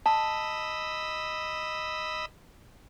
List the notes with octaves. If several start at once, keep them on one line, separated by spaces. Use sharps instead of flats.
D#5 A5 B5 E6